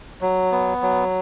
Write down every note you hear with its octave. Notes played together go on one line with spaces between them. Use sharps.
F#3
B3
F#3